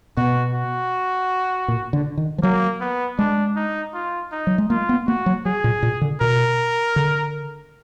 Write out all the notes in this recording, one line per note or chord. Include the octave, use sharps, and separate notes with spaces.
B2 F#4
F#4
A#2
D3
D#3
F3
F#3 A#3
B3
G#3 D4
D#4
F4
D#4
F#3
G#3
A#3 F4
B3
A#3 F#4
F#3
F#3 G#4
A#2
A#2
D3
B2 A#4
D3